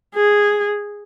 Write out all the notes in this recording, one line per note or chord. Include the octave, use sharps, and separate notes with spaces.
G#4